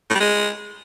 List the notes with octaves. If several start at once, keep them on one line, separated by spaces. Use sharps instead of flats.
A2
G3
G#3